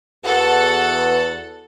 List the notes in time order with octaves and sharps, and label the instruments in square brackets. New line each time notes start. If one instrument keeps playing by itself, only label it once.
[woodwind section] E2 [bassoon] F#4 [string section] A4 F#5